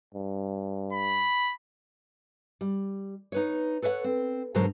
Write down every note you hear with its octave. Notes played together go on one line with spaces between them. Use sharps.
G2
B5
G3
D#4 B4 C#5
A4 B4 C#5 E5 F#5
C4
G#2 B2 D3 F#3 A#4 C5